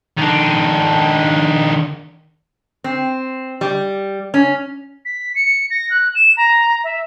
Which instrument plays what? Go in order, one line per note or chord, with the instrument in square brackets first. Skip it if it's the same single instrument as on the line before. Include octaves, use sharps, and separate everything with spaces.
[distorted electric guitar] D#3 D4
[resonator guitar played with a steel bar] C4
G3
C#4
[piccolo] B6
C#7
A#6
F#6
E7
A#5
E5